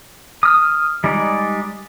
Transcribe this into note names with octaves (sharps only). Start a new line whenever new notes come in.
D#6 F6
G3 G#3 D#4 D5